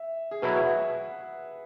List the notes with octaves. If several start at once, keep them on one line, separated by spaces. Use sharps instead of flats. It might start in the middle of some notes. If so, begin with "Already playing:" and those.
Already playing: E5
G#4
B2 F#3 E4 B4
E5
F#5